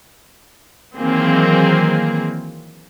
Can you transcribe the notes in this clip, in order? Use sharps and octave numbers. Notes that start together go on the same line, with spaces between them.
D#3 E3 F#3 A#3 C4 G#4